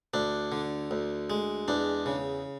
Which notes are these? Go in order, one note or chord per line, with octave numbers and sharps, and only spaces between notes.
D2 D4
D3
D2
G#3
E2 D4
C#3